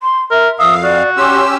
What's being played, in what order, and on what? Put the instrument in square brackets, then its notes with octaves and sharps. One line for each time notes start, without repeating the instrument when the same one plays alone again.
[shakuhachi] C6
[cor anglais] A#4 [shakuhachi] E5
[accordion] F2 F5 [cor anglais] E5 [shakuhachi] D#6
[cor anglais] F#4 [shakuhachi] D5
[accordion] C#4 G4 E6 [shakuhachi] C6